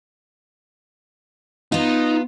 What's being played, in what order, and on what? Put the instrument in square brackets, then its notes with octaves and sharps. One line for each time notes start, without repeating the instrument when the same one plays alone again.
[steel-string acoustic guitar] B3 F4 [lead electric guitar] D#4